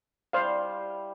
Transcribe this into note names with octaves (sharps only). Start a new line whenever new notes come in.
G3 E4 C5 F5